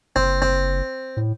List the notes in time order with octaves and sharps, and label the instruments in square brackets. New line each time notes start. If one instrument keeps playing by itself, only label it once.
[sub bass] F#1 [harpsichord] C4
[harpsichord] C4
[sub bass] A2